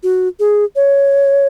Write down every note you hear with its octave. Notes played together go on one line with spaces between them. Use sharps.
F#4
G#4
C#5